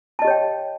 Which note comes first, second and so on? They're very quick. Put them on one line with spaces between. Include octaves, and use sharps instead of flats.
A5 D#5 G4 C#5 G5